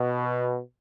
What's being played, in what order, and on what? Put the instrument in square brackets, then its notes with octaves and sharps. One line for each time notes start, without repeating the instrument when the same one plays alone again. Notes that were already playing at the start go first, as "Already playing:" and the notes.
Already playing: [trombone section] B2